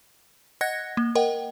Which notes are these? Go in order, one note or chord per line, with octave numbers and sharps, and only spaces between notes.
D#5 F#5 F#6 G#6 A#6 C#7
A#3
A#4 D#5 F#5 G5